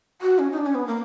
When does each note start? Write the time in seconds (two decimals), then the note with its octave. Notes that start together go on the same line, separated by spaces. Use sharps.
0.22 F#4
0.39 C#4
0.52 D#4
0.58 D4
0.66 C#4
0.75 B3
0.87 A#3